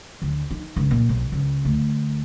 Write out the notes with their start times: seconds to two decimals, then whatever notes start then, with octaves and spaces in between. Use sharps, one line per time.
0.22 D2
0.51 D#4
0.76 C#2
0.91 A#2
1.09 B1
1.32 C#2
1.65 D2